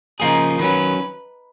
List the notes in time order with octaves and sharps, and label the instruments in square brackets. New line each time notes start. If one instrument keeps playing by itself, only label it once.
[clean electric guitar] C#3 F3 A#3 F4 G#4 [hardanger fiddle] D#4
[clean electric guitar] D#3 F#3 C#4 [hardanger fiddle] B4